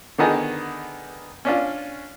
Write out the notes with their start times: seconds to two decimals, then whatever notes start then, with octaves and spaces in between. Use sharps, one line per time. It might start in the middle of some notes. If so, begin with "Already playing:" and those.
0.18 D3 D#3 B3 D#4 G#4
1.45 C#4 D4 F4